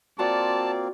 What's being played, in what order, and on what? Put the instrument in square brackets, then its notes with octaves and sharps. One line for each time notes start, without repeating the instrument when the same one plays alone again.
[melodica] A#3 C4 [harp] F4 F#4 [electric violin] D5 [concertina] A5